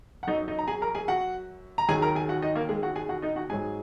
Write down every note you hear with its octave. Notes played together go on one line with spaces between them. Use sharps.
F#5
F#2 F#3 D#4 D#5
D#4 D#5
A#5
G#4 G#5
A#4 A#5
G#4 G#5
F#4 F#5
A#5
D#2 D#3 F#3 G#4 G#5
A#4 A#5
G#4 G#5
F#4 F#5
D#4 D#5
A#3 A#4
G#3 G#4
F#4 F#5
G#4 G#5
F#4 F#5
D#4 D#5
F#4 F#5
G#2 F#3 G#4 G#5